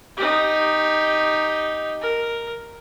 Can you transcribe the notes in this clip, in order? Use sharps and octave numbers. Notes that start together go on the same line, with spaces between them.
D#4 G4
A#4